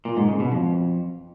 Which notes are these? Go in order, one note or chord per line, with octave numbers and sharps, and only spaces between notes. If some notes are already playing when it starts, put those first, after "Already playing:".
A#2
G#2
C#3
B2
F2